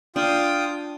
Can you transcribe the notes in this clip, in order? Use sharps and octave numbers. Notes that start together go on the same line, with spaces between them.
D4 F4 G5 D#6